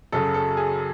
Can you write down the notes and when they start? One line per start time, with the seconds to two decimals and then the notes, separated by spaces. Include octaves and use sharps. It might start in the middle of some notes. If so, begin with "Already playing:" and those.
0.12 F#2 C#3 F#3 A4
0.34 A4
0.57 G#4